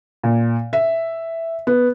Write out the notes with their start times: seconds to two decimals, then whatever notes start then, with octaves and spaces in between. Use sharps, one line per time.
0.23 A#2
0.73 E5
1.67 B3